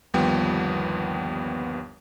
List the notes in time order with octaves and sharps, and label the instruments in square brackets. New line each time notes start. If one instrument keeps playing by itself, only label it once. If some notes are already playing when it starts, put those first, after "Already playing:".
[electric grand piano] G1 D#2 F3 G3 B3 G5